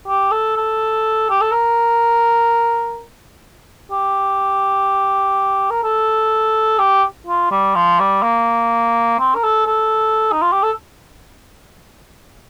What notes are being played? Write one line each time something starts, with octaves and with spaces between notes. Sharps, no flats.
G4
A4
A4
G4
A4
A#4
G4
A#4
A4
G4
F4
G3
F3
G3
A#3
C4
A#4
A4
A4
D#4
F4
G4
A4